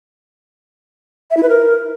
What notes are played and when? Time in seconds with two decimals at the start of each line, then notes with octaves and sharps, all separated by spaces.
1.31 E5
1.37 E4
1.43 B4
1.49 A#4